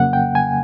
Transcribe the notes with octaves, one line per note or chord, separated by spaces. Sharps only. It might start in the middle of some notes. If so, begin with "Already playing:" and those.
Already playing: F2 C#3 F#3 A#3 F#5
G5
G#5